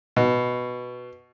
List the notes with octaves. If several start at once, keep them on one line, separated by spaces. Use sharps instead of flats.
B2